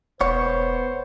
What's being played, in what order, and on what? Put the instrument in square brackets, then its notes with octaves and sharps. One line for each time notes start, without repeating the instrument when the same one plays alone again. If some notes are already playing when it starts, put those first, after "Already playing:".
[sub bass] E1 [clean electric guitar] B3 C#5 [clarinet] C5